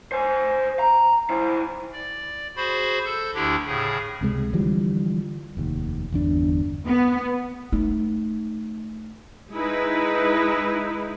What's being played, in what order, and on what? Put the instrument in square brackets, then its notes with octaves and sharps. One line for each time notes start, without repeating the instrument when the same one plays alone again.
[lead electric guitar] C5 G#5
A#5
E4 C5
[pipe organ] D5
F#4 G#4 C5 B5
A4 G6
D2 D3 D4 E4 G4
A2 C#3 G#4
[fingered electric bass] C#2 C3 E3 G#3
D3 E3 F3 G3
F1 D#2
G1 E2 D4
[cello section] B3
[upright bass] A3 D#4
[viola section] G#3 D#4 E4 B4